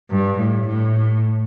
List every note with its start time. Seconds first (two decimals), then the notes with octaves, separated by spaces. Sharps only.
0.11 G2
0.39 A2
0.68 A2